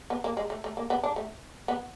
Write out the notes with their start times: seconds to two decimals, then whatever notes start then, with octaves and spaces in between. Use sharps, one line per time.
0.10 B3
0.24 A#3
0.37 G#3
0.50 A3
0.64 A3
0.77 A#3
0.90 B3
1.03 D4
1.16 A3
1.68 B3